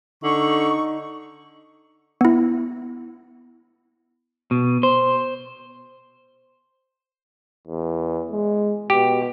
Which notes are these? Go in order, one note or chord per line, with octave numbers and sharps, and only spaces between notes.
D3 D#4 C#6
B3 E4
B2
C5
E2
G#3
B2 G4